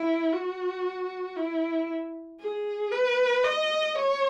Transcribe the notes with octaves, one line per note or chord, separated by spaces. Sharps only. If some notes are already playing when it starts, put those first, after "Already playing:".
Already playing: E4
F#4
E4
G#4
B4
D#5
C#5